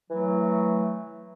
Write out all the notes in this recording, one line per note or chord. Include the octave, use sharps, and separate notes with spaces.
E3 F#3 A3